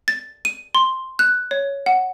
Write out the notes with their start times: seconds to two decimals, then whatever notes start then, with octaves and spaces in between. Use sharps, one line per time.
0.08 A6
0.45 D#7
0.75 C6
1.19 F#6
1.51 C#5
1.86 F#5